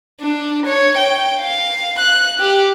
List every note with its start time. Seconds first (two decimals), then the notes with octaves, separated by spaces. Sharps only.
0.21 D4
0.66 C#5
0.98 G5
1.41 F5
1.99 F#6
2.39 G4